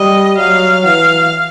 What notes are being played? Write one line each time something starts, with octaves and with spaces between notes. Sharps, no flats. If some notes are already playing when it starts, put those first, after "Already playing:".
Already playing: G3 D#5
F#3 F5
E3 F5